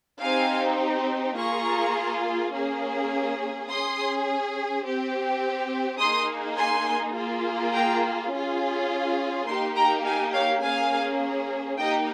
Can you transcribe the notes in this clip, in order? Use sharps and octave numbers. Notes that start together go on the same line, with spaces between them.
C4 D#4 G4 F5 G#5
A#3 F4 G#4 A#5 C#6
A#3 C#4 G#4
C#4 G#4 C6 D#6
C4 G4
A#3 D#4 G#4 C6 D#6
G#5 C6
A#3 F4 G#4
G5 A#5
C#4 F4 G#4
A#3 D#4 G4 G#5 C6
G5 A#5
F5 G#5
C#5 F5
A#3 C#4 G#4 F5 G#5
A#3 D#4 G4 D#5 G5